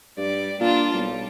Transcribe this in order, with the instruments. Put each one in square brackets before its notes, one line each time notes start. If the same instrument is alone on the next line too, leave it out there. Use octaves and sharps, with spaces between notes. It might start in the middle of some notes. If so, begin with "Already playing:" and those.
[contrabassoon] G2 [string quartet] G3 D5
[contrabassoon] A#2 [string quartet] D4 F4 A5
[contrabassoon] B1 [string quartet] G3